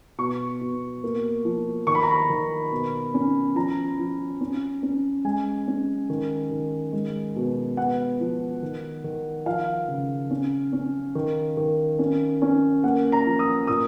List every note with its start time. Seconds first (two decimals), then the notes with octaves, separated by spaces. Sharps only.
0.18 B2 C#6
0.61 B2
1.04 A#3
1.45 F3
1.87 D#3 C#6
1.95 B5
2.03 A#5
2.11 B5
2.30 D#3
2.71 B2
3.14 C#4
3.55 F3 A#5
3.99 F3
4.41 C#4
4.83 C#4
5.25 G#3 G#5
5.67 C#4
6.10 D#3
6.51 D#3
6.93 G#3
7.36 B2
7.77 B3 F#5
8.20 F3
8.63 D#3
9.04 D#3
9.46 F3 F5
9.88 C#3
10.30 C#4
10.73 C#4
11.15 D#3
11.57 D#3
11.99 C#4
12.42 C#4
12.84 A#3 F#5
13.12 A#5
13.26 F3
13.39 D#6
13.67 A#2 D#6